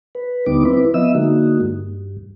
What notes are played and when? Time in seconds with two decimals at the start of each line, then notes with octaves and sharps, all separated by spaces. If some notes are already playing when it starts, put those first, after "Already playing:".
0.15 B4
0.46 D#2 D3 G3 B3 D#4 D6
0.65 C4 E4 B4
0.94 F3 B3 D#5 E5 E6
1.15 D3 G#3 A#3 D#4 F#4
1.61 G2